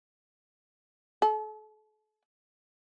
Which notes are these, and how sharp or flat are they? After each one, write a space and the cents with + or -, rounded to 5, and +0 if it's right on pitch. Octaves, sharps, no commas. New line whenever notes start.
A4 -40